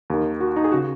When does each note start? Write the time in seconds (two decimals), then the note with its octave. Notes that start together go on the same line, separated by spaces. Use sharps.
0.10 D#2 D#3
0.41 F#4
0.56 D#4
0.64 G#4
0.72 C#3 F#4